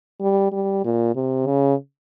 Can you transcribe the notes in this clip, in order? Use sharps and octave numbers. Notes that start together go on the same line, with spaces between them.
G3
G3
A#2
C3
C#3